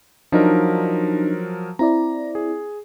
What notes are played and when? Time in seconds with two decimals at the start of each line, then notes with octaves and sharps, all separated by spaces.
0.32 F3 F#3 D4 D#4 A#4
1.79 C4 E4 D5 A#5
2.35 G#4